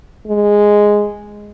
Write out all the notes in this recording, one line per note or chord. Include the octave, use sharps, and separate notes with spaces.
G#3